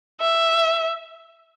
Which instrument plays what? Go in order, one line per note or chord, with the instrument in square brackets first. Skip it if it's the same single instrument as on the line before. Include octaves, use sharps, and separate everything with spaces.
[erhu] E5